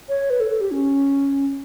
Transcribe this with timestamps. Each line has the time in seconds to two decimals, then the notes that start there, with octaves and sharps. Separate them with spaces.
0.09 C#5
0.30 B4
0.40 A4
0.50 A4
0.61 G4
0.71 C#4